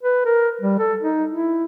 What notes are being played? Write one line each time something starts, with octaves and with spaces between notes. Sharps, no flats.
B4
A#4
G3
A4
D#4
E4